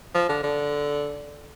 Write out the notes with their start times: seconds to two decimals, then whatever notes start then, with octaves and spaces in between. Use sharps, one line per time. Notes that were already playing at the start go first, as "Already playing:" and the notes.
0.14 F3
0.29 D3
0.43 D3